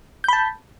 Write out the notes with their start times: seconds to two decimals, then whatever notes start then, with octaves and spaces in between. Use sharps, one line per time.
0.24 G6
0.28 B5
0.33 A5